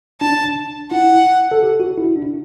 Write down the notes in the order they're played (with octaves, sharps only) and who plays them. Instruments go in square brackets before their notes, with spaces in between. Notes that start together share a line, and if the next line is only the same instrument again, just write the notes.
[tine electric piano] D4 [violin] A5
[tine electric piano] E4 [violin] F#5
[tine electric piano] A4
G4
F#4
E4
D4